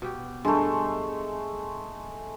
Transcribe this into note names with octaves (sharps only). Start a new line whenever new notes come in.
B2 G4
G2 G#3 A3